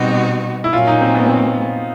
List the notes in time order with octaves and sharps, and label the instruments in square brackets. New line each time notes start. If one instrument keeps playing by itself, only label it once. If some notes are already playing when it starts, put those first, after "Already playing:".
Already playing: [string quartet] B2 G3 C4 D#4 F#4 [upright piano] G4
[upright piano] E4
[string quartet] A#2 F#3 A#3 C#4 [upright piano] F4
[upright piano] D#4
C4
B3
C4